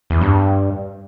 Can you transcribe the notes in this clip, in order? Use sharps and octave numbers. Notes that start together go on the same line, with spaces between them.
E2
G2